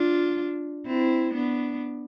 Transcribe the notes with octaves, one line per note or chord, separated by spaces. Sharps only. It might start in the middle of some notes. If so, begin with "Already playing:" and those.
Already playing: D4 F4
C4 E4
B3 D4